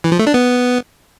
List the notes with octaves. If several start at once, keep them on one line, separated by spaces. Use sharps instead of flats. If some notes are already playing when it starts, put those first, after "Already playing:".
E3
F3
A3
D4
B3